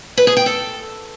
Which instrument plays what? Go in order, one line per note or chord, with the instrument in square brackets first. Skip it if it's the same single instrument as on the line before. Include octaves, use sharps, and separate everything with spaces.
[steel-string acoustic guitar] B4
G#4
G5
A4